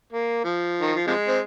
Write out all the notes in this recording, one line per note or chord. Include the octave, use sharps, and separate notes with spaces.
A#3
F3
D#3
F3
C3 F3 G#3
C4